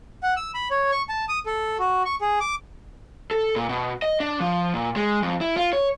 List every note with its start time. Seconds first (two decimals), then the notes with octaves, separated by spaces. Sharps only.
0.23 F#5
0.37 E6
0.54 B5
0.71 C#5
0.92 C#6
1.09 A5
1.29 D#6
1.46 A4
1.79 F#4
2.05 C#6
2.21 G#4
2.40 D6
3.31 A4
3.56 A#2
3.69 B2
4.02 D#5
4.20 D4
4.40 F3
4.74 A#2
4.96 G#3
5.22 F2
5.41 E4
5.57 F4
5.73 C#5